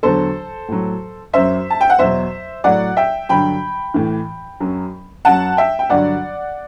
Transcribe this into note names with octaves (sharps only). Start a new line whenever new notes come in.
E2 D3 F#3 A4 C5
A2 F#3
F#2 F#3 C5 E5
A5
G5
F#5
E2 B2 F#3 C5 E5
A2 F#3 D5 F#5
E5 G5
G2 D3 F#3 G5 B5
A2 E3
F#2 F#3
F#2 F#3 F#5 A5
E5 G5
G5
G2 D3 F#3 D5 F#5